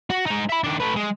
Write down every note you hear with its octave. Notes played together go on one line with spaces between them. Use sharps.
F#4
G#3 D#4
E5 B5
D#3 D4
A3 B4
G#3